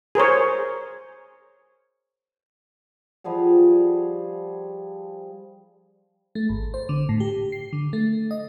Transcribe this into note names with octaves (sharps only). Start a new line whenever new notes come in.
G#4 A#4 C5 C#5
F3 G3 G#4 F#5
A3
G#1
C5
D3
A2
G4
C7
D3
A3
D#5